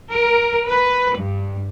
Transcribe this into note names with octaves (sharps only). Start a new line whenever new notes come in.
A#4
B4
G2